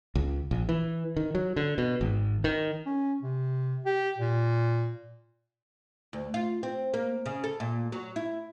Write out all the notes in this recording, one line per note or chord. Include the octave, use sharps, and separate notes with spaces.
C#2
A#1
E3
D#3
F#3
D3
B2
G#1
D#3
C#4
C3
G4
A#2
D2
F4
C4
A#3
C#3
A4
A#2
F#3
E4